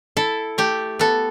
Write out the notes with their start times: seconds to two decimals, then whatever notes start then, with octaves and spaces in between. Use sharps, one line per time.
0.17 E4 A4
0.58 A3 G4
0.99 B3 A4